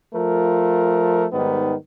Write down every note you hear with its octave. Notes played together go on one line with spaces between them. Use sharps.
F3 A3 F4 A#4
G#2 D#3 G3 B3